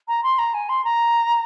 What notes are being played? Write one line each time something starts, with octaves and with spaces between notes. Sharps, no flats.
A#5
C6
A#5
G#5
C6
A#5